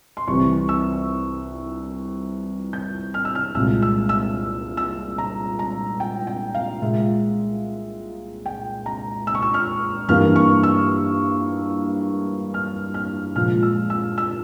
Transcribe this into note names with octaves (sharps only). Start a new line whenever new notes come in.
C6
C2 C3 E3 C#6
E6
G6
F6
E6
F6
C2 A#2 G#3 E6
E6
E6
E6
A#5
A#5
G5
G5
F5
A#2 G#3 E5
G5
A#5
E6
C#6
E6
F6
G2 E3 A#3 F6
C#6
E6
F6
F6
A#2 F3 G#3 F6
E6
E6
E6